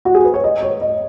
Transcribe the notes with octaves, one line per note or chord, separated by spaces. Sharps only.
F#4
G#4
B4
C#5
D#5
C#5
D#5